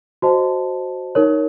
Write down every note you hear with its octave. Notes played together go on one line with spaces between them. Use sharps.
F#4 C5 D#5 A5
D#4 A#4 C#5